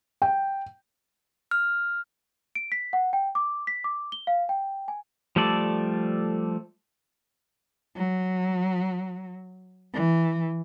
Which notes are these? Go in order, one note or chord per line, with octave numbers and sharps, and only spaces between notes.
G5
F6
D7
B6
F#5
G5
D6
B6
D6
G7
F5
G5
G#5
F3 G3 A3 A4 D5
F#3
E3